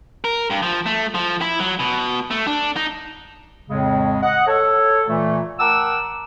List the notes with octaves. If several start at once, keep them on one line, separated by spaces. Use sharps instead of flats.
A#4
G2
F3
A3
F3
E4
F#3
B2
A3
D4
D#4
F2 A2 C#3 G#3
D#5 F#5
A4 C#5
A#2 E3 A3
A#4 F#5 G5 A5 D6 E6